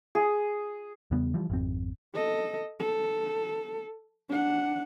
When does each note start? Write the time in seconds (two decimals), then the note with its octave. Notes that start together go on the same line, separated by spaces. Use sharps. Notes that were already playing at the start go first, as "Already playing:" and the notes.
0.15 G#4
1.11 E2 C#3 G3 B3
1.34 E3 F3 G3
1.50 G#1 F2 C4
2.15 A4 D#5
2.80 A4
4.29 D4 F#5